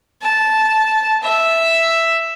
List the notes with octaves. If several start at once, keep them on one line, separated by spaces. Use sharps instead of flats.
A5
E5